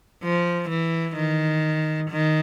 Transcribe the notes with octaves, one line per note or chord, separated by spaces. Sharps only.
F3
E3
D#3
D#3